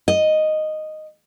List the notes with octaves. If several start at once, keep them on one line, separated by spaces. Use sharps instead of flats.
D#5